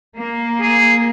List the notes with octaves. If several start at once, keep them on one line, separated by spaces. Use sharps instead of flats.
A#3
G#4